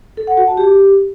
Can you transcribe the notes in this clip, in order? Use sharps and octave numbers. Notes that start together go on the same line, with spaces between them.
A4
F#5
F#4
A5
G4